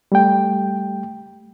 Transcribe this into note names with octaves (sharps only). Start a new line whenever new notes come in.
G3 A3 G5